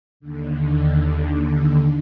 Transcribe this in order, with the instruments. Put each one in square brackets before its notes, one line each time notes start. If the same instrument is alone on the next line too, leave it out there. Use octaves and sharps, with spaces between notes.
[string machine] D#2 D3